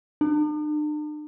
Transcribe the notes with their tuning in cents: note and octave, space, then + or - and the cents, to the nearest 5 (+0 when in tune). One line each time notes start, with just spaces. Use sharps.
D4 +45